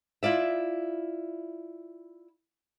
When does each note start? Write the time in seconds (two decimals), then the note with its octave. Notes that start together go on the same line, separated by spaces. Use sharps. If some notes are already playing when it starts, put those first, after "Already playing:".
0.23 E4 F4 D5 E5